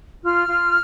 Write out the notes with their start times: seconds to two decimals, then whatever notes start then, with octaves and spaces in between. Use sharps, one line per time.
0.23 F4 F6
0.48 F4